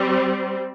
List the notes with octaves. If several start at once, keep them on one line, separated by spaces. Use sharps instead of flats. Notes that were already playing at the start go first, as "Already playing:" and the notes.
Already playing: G3 C4